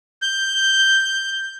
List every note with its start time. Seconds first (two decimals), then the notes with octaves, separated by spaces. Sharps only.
0.22 G6